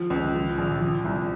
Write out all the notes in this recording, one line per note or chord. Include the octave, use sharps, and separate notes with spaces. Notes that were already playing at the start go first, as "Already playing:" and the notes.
Already playing: F3
C#2
F3
A#1
F3
C2